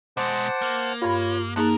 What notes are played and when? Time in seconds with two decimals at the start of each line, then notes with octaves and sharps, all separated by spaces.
0.17 B2 G#3 C5 F#5 A5 D6
0.62 A#3
1.02 G2 F4 C#5 B5
1.56 C2 A#3 D#4 G#4 A#4 A5 F#6